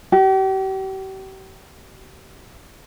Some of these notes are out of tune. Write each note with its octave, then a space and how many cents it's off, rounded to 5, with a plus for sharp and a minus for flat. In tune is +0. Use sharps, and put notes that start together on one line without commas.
G4 -40